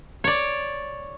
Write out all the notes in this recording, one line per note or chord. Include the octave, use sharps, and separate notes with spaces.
C#5 D5